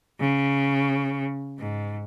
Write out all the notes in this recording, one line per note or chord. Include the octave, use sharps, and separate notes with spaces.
C#3
G#2